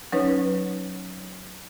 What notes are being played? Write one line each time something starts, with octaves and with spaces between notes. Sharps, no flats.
F#3 C#4 D#4 B4 C#5